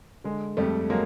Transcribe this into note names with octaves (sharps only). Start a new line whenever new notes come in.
D3 G#3
F2 G3 A3
F#3 G#3 A#3